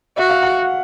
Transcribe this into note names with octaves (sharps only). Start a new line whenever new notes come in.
F#4 E5
F5
F#5